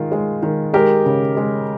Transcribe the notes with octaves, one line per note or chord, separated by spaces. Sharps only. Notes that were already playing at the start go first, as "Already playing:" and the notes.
Already playing: D#3 G#3 F4
G#3
D#3
G#3 G4 A#4
C#3
G#3